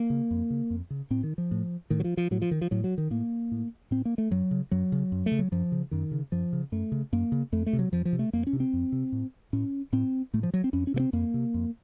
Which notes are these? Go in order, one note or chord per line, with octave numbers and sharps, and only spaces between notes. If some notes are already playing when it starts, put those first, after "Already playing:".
Already playing: A#3
C#3
F2
C#3
F2
C#3
A2 C4
D#3
F3
A2
A2 D#3
F#3
F3
F3
A2 F#3
F3
D#3
F3
A2 F#3
F#3
D#3
A2 A#3
A2
A2 C4
A#3
A3
F#2 F#3
C#3
F#2 F#3
C#3
F#2
A3
C#3
F#3
F#2 F3
C#3
F#2 D#3
C#3
F#2 F3
C#3
F#2 A3
C#3
F#2 A#3
C#3
F2 A3
A3
C3
F#3
F2 F3
F3
C3
A3
F2 A#3
C#4
C3
C4
F2
C3
A2
A2 C#4
A2 C4
A2 A3
F3
F#3
C4
F2 C#4
C#4
C3 A#3
C4
F2 A#3
C3
F2